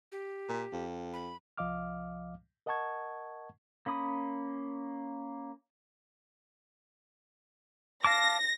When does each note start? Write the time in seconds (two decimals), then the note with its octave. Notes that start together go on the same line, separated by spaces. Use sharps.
0.12 G4
0.49 A#2
0.73 F2
1.13 B5
1.58 C2 F3 D#5 F5 D6 F6
2.66 A#4 D#5 F#5 A5 C#6 G#6
3.86 A#3 C#4 B5 D#6
8.04 F5 A5 D6 A#6